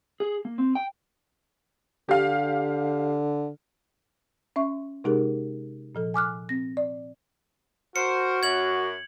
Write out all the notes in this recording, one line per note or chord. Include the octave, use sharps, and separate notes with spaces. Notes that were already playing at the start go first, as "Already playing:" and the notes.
G#4
A#3
C4
G5
D3 G4 F5
C#4 E5 C#6
C3 G#3 D#4 G4 G#4 A#4
A#2 F3 A4
G#5 D6 F6 F#6
C4 A#6
D5
F#4 A#4 C5 C#7
F#2 G#6 F#7